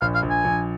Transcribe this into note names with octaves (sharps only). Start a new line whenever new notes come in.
A#1 F5
F5
A#1
G#5
A#1